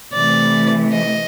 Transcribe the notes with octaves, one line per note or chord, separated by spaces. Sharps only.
C3 E3 A3 D5
D#5